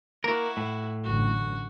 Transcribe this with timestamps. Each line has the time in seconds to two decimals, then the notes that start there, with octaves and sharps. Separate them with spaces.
0.24 A#3 E4 F#4 A#4
0.57 A2
1.04 A1 F#2 D3 F#4